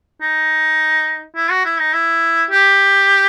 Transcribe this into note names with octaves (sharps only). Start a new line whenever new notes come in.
D#4
E4
F#4
E4
D#4
E4
G4